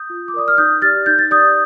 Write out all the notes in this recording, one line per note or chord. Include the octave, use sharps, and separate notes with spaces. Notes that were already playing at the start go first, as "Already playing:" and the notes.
Already playing: D#6 G6
F4
D6
A#4 D5 D#6
F6
D#4 D#6 G6
G4 D5 F6 A6
D#4 G6
A6
G4 D5 D#6 G6